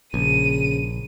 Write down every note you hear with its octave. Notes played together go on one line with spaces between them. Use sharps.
A#1 C#3 D#7